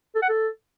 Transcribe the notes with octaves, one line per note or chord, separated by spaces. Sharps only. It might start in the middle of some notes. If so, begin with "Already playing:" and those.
A4
F#5
A4